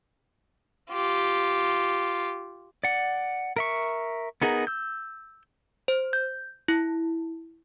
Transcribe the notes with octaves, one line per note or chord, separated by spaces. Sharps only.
F4 G4
D5 F#5
A#4 E5 C#6
B3 D#4 G#4 A#4 F#5
E6 G6
C5
G6
E4